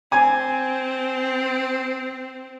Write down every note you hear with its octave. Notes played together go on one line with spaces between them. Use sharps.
C4 G#5